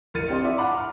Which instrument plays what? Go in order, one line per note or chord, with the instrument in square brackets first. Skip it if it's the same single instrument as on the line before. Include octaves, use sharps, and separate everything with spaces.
[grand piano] A1 A#4 F6 A6 C#7 D#7
C4 G4 D#5 C6
E4 D5 E5
F5 F#5 A5 B5 C6 D6
A#5 F6